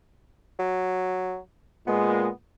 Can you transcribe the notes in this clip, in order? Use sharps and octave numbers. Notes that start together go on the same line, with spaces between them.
F#3
A#2 G#3 B3